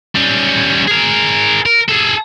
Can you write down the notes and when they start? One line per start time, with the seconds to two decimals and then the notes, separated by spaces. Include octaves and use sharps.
0.15 G3 C#4
0.87 G#4 A#4
1.66 A#4
1.89 G#4 A4